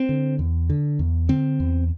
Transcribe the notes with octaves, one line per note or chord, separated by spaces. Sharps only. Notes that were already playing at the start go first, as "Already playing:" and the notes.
Already playing: C4
D3
E2
D3
E2
D3 C4
E2